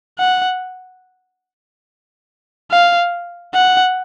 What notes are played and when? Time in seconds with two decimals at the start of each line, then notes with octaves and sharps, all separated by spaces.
0.19 F#5
2.71 F5
3.55 F#5